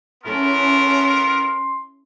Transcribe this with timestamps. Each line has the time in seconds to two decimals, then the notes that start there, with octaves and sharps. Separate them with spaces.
0.24 B3 C#4 E4 A4 A#4 C6